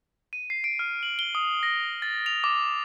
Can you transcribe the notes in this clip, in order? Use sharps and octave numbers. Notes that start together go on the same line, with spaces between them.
D#7
C7
D7
F6
F#7
G7
D#6
A#6
A6
F7
D6